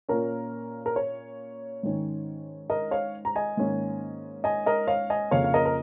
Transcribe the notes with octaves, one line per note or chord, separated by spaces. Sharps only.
A#2 A#3 C#4 A#4
A#4
C#5
G#2 D#3 C#4
A#4 D#5
C#5 F5
A#5
D#5 G#5
G#2 D#3 A#3 C#4
D#5 G#5
A#4 D#5
C#5 F5
D#5 G#5
F2 C#3 A#3 C#4 C#5 F5
F5
A#4 D#5
A#4